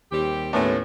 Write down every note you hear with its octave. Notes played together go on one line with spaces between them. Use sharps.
D#2 G3 C4 G4
A2 G#3 A3 B3 C#4